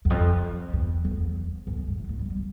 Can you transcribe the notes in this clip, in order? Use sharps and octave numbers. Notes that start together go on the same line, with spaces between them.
E2
F2
E2
F2
E2
E2
F2
G2
A2
A2
G3
G3